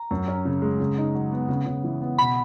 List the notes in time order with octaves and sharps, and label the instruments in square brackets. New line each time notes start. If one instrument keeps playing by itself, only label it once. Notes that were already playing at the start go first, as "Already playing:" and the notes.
Already playing: [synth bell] A#5
[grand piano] F#2
C#4
C#3
G#3
C#3
D#4
F#3
B3
C#3
C#3
E3
B3
[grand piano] B2 [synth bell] B5